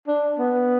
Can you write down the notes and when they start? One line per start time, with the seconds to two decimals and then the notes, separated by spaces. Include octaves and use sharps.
0.07 D4
0.39 B3